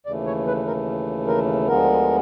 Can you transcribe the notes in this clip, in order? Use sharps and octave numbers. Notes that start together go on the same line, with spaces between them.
D#2 C#3 E3 A3 D5
C#5
B4
A#4
A#4
D2 D3 F3 G#3 B3 A#4